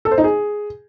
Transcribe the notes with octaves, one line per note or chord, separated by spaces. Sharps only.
A4
C5
D#4
G#4